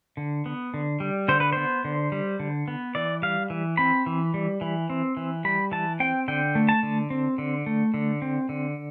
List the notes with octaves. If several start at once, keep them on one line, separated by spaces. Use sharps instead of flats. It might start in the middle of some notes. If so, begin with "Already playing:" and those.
D3
B3
D3
G3
D3 C5
B4
B3 C5
D3
G3
D3
B3
E3 D5
G3 F5
E3
C4 B5
E3
G3
E3
C4
E3
G3 B5
E3 A5
C4 G5
D3 G5
A3
A5
D3
C4
D3
A3
D3
C4
D3